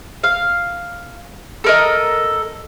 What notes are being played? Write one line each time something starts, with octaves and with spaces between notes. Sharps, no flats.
F5
A4 A#4 D#5